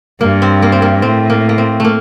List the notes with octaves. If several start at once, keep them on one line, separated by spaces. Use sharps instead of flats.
G2 A#3
C4
A#3
C4
A#3
A2 C4
A#3
A#3
C4
A3 A#3